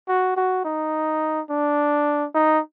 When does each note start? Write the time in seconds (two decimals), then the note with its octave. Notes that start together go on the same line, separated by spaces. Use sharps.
0.09 F#4
0.37 F#4
0.65 D#4
1.50 D4
2.35 D#4